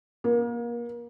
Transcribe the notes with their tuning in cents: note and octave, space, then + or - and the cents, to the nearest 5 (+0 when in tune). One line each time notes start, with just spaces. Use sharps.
A#3 +30